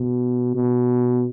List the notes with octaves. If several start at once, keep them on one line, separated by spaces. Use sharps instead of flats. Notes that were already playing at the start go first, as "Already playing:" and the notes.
Already playing: B2
B2